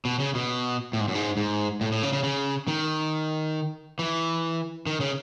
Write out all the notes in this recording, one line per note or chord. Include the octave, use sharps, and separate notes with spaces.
B2
C#3
B2
A2
G#2
F#2
G#2
G#2
A2
A2
C#3
C#3
C#3
D#3
E3
D#3
C#3